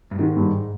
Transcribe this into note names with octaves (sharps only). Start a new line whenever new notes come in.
G2
G#2 D#3
G2